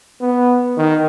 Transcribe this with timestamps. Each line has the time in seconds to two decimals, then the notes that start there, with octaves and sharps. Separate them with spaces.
0.21 B3
0.77 D#3